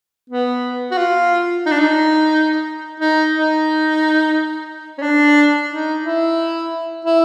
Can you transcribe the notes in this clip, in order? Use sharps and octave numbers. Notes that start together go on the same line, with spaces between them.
B3
F#4
F4
D#4
D4
D#4
D#4
D#4
C#4
D4
D#4
E4
E4